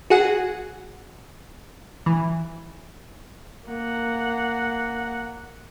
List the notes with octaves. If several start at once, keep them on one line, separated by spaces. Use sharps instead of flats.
F#4 G#4 F#5
E3
A#3 F#5